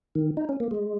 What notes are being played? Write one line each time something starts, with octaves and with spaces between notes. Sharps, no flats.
D#3
D#4
C#4
A#3
G#3